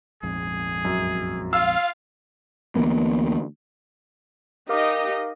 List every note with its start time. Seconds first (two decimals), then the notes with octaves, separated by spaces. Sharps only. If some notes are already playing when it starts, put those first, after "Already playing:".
0.23 A#1 F2 G#2 G#4
0.85 F#2
1.53 F4 F5 E6
2.75 D2 E3 A#3 B3
4.69 D#4 G4 A#4 D#5 F5 D6